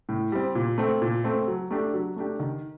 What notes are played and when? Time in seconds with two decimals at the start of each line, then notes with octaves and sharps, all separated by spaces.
0.09 A2
0.32 G3 C4
0.55 A#2
0.78 A3 C4
1.02 A#2
1.24 A3 C4
1.47 F#3
1.71 A3 D4 G4
1.94 F#3
2.16 A3 D4 G4
2.40 D#3